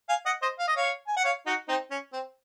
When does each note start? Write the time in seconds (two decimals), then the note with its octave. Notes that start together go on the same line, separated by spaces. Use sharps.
0.09 F5 G#5
0.26 D#5 F#5
0.42 C5 D#5
0.59 F5
0.67 D#5
0.76 C#5 F5
1.07 G#5
1.16 F#5
1.24 C#5 F5
1.46 D#4 F#4
1.68 C4 D#4
1.91 C#4
2.13 C4